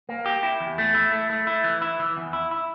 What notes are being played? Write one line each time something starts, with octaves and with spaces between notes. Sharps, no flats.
A#3
G4
E4
E2
A3
E4
A3
A3
E4
E3
E4
E3
E2
E4
E4